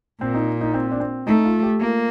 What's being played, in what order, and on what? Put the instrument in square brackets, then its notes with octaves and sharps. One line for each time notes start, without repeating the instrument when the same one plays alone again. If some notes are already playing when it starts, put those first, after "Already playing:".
[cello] A#2 [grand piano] C4
[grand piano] D#4
D#4
C4
D4
C4
[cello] A3 [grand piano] D#4
[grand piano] F4
G4
[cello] A#3 [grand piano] F4